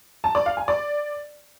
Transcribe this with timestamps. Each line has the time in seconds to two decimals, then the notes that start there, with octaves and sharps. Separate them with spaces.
0.24 A5
0.35 D5
0.46 F5
0.57 G#5
0.68 D5